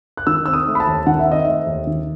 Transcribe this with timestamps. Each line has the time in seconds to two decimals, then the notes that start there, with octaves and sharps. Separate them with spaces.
0.17 F#6
0.27 D#3 E6
0.46 C4 E6
0.53 D#6
0.67 A3
0.75 B5
0.80 A5
0.87 D#2
1.07 D#3 F#5
1.19 E5
1.27 C4 D#5
1.44 A3 E5
1.67 D#2
1.87 D#3